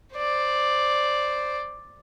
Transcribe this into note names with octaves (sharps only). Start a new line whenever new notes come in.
C5 D5